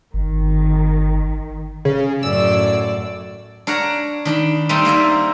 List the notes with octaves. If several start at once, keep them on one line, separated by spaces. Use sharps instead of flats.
G1 D#3
C#3
F#2 A2 D5 E6
D4 A#4 C#5 F#5 A#5
D#3 D4 B5
G3 A3 C4 D4 D#4
A#3 D#4 D5 E5